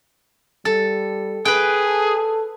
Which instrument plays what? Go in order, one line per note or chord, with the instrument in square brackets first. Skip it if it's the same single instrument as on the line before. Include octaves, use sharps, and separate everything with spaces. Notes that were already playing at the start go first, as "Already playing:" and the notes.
[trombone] G3 [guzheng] A4
[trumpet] G#4 [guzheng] B4 G5
[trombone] A4